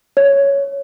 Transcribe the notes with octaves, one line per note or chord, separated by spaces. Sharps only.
C#5